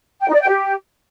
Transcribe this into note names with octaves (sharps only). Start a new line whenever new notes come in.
G5
D#4
D5
G5
G4